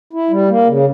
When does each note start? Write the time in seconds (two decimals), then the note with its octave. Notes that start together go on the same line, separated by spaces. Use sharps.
0.13 E4
0.31 G3
0.49 A#3
0.67 C#3